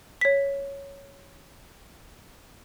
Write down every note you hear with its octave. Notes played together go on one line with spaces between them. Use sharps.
C#5 B6